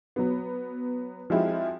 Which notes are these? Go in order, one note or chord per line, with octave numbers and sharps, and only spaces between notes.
F#3 B3
F3 G#3 C4 E4 F#4 G4